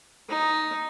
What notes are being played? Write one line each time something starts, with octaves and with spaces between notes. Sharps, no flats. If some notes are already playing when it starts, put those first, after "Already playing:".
D#4